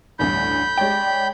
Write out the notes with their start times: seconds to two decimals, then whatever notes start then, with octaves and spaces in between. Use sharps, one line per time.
0.19 A1 D2 G2 B5 G6
0.78 G#3 C#5 D5 G5